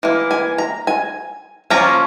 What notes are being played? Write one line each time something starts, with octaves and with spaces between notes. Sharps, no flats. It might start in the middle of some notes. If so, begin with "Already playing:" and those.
E3 A#3
G#5
A#5
G#5
F3 A#3 C#4 A#5